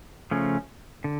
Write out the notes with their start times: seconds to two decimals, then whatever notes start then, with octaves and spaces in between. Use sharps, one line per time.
0.31 C#3 F3 A3 C#4
1.04 D3